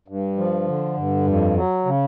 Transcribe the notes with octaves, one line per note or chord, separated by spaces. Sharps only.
G2
F3
D3
G2
F2
F#3
C#3